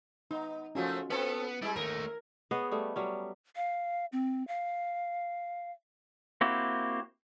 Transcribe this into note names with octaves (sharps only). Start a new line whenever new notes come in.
B3 D#4
F3 A3 A#3 C#4 F4 F#4
B3 C4 A4 B4
G3 G#3 E4
D#2 A3 A#4
B3 G#4 C#5 D#5
G3 A3
F#3 G3 C#4
F5
C4
F5
A#3 C4 E4 F#4 G4